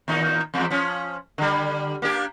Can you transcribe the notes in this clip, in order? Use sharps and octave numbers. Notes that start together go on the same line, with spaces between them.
D#2 A#2 D#4
E2 F3 G#3
F3 C#4
D3 G3
A#3 D4 G4